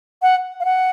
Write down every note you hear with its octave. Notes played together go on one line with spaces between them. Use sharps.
F#5
F5
F#5